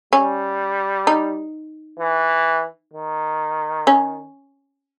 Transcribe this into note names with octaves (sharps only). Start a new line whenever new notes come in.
G3 C#4
D#4
E3
D#3
C#4